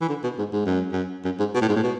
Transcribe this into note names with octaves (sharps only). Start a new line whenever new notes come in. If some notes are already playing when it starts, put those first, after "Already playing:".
E3
D3
B2
G#2
G#2
F#2
F#2
F#2
G#2
B2
A2
G#2
A2
B2